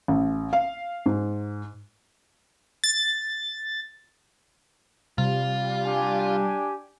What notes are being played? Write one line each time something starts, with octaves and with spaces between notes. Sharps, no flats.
A1
F5
G#2
A6
C3 G3 F4
D4 G4 G#5